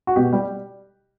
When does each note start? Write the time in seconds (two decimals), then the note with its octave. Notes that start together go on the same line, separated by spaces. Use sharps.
0.07 F#4
0.16 B2 G4
0.33 G3